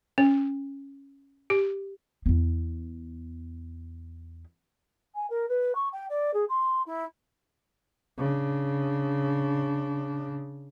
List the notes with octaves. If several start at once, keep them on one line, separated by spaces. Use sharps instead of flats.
C#4
G4
E2 B3
G#5
A#4
B4
C#6
G5
D5
G#4
C6
E4
C#3 D4